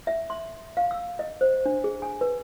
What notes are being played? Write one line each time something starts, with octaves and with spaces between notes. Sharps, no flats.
E5
C6
F5
E6
D#5
C5
D4
G#4
G#5
B4